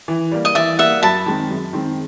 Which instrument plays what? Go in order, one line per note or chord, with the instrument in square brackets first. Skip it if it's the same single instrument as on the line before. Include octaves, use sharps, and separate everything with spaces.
[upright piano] E3
G3 A#3
[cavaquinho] D#5
[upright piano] E3 [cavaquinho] D5 E5
[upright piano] G3 A#3 [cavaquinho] E5 F#5
[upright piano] F#2 [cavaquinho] A5 B5
[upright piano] D#3 G#3 C4
F#2
D#3 G#3 C4